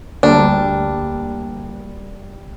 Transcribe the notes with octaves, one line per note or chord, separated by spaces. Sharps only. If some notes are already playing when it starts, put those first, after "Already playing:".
D2 G3 A#3 D4